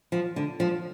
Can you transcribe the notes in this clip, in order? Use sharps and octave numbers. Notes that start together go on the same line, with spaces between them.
F3
D3
F3